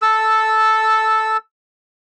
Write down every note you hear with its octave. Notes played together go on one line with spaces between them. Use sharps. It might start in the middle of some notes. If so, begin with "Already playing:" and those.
A4 E6